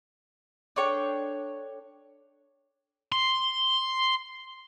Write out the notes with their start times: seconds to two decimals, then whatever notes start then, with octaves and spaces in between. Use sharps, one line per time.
0.76 D4 A4 C#5 G5
3.12 C6